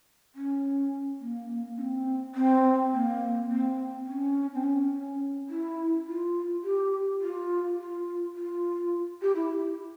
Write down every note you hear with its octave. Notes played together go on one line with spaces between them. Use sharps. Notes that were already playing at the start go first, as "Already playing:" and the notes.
C#4
A#3
C#4
C4
C4
A#3
C4
C#4
C4
C#4
E4
F4
G4
F4
F4
F4
G4
E4